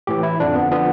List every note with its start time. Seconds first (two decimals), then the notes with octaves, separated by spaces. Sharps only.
0.07 A2 E3 G4
0.23 E4
0.40 F2 D3 F3 D4
0.55 B3
0.71 D3 F3 B3